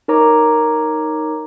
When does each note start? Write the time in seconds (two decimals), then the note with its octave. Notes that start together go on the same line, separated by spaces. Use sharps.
0.08 D#4 A#4 C#5 A#5 D6